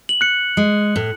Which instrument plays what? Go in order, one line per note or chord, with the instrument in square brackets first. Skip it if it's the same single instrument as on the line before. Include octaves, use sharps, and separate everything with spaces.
[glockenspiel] F#7
F#6 C#7
[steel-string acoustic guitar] G#3
A2